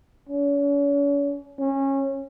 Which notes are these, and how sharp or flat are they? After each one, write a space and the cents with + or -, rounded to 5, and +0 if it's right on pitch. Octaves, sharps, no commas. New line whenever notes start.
C#4 +40
C#4 -25